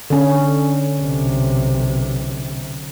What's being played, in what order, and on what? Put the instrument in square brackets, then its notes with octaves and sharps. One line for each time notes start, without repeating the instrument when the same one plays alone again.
[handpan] D3 C#4
[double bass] B1 C3